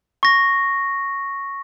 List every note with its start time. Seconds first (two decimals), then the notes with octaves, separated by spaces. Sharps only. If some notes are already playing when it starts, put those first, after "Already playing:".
0.23 C#6 A#6